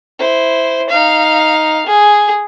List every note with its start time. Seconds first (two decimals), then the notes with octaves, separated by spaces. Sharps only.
0.19 E4 C5
0.89 D#4 F5
1.86 G#4